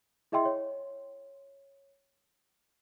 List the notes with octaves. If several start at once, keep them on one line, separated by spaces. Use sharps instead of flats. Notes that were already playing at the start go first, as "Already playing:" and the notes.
E4 G#4 D#5 E5 G5 C6
C#5